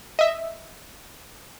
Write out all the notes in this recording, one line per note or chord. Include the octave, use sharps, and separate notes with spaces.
D#5 E5